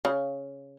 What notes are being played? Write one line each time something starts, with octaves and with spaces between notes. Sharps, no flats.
C#3